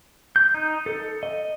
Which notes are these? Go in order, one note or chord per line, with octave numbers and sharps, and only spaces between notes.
G6
D#4
A4
D#5